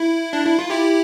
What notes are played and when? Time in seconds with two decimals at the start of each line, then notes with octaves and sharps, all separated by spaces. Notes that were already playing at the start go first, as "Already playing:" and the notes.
Already playing: E4
0.33 D4
0.46 E4
0.59 F4
0.70 E4 G4